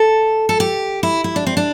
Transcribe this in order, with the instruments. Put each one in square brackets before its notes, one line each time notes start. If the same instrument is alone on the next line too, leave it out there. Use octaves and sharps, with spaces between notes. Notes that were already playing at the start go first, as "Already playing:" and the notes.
Already playing: [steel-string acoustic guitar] A4
A4
G4
E4
E4
D4
C4
D4